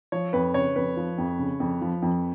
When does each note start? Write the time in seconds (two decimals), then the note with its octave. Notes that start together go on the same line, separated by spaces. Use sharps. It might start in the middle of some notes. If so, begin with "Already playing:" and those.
0.12 F3 C#5
0.33 F2 B4
0.54 C#3 C#5
0.76 F2 B4
0.97 F3
1.18 F2
1.39 C#3
1.60 F2
1.81 F3
2.02 F2